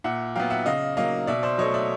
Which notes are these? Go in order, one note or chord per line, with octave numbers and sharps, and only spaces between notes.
A#2 E5 F#5
F#3 B3 F5 G5
E5 F#5
C#3 D#5 F5
F#3 A#3 D#5 F5
B2 D5 E5
C5 D5
F#3 A3 C#5 D#5
D5 E5